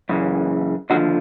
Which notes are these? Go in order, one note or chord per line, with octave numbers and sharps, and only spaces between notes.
F#2 C#3 E3
D#2 D3 F3 F#4